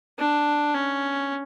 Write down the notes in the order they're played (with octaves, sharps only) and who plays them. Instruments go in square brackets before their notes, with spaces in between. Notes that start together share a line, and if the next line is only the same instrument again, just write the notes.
[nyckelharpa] D4
C#4